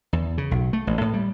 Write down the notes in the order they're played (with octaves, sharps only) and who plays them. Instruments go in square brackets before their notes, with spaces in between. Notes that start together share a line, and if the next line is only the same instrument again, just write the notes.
[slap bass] E2
C#3
B1
A3
A1
A2
G3